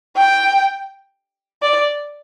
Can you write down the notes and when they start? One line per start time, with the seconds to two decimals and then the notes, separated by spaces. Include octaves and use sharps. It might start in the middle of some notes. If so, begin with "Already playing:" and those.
0.17 G5
1.62 D5